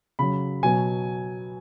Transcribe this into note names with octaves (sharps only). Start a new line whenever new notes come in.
C#3 F#3 B5
B2 F#3 G#5